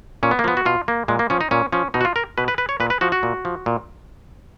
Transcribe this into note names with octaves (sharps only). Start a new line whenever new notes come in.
A#2 C#4
B3
A#3
F3 B3
F#4
B2 F4
A#3
A#2 G#3
A#3
F3 C#4
D#4
A#2 C#4
F3 C#4
B2 D#4
F#4
F4
A#4
B2 B4
B4
B4
C#5
A#2 B4
B4
F3 F#4
F#4
A#2
F3
A#2